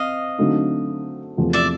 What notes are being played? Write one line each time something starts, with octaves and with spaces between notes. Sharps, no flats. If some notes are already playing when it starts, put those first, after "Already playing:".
Already playing: C4 D#5 F5
D3 F#3 A3 C4 D#4
E2 C3 F3 A3
D5 E5